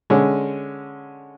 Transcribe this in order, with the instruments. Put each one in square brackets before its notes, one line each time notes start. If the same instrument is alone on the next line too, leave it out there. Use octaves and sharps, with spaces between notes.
[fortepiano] D3 G#3 C#4